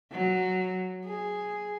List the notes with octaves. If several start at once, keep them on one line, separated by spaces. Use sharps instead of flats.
F#3
G#4